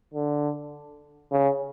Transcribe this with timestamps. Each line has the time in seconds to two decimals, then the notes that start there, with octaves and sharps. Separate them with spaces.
0.14 D3
1.32 C#3